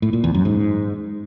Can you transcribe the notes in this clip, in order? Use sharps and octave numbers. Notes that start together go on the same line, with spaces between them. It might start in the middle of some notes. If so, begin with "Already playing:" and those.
A2
A#2
E2
F#2
G#2